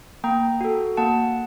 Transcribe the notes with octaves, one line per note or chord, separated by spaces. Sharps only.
A#3 G5 A#5
F#4 A4
A#3 F#5 A5